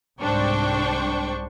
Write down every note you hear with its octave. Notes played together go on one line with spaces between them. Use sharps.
C2 G#2 D4 C5 G5 C#6